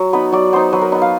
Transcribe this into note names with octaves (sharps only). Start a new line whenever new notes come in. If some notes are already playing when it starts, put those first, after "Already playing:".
Already playing: F#3
B3 D#4 B4
F#3 D5
B3 D#4 C5
F#3 B4
A#4
B3 D#4 B4
F5